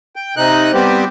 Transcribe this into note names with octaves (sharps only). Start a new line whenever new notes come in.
G5
C3 D#4 F#6
G3 B3 C4 G4